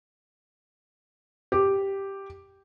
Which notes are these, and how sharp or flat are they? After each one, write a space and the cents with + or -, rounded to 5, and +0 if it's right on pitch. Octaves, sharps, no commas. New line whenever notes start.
G4 +0